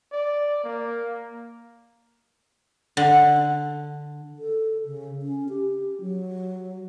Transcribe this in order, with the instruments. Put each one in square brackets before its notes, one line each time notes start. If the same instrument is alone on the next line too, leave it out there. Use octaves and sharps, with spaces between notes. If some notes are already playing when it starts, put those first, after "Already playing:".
[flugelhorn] D5
A#3
[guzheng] D3
[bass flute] A4
C#3
C#4
G4
F#3